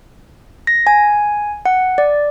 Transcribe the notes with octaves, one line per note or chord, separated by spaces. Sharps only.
A#6
G#5
F#5
D5